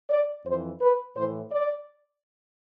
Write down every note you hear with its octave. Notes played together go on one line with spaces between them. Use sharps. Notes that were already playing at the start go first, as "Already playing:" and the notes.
D5
F2 E3 C5
B4
A2 E3 C5
D5